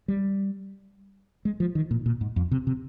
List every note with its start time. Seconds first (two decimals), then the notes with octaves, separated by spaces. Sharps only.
0.08 G3
1.45 G#3
1.60 F3
1.75 D#3
1.91 A#2
2.06 A#2
2.21 G#2
2.36 F2
2.51 C3
2.67 C3